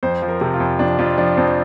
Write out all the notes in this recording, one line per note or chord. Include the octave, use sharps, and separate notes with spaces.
F2 C5
F3
A#4
C3
F4
F2
F2 D4
F2 F4
F3 D4
F2 C4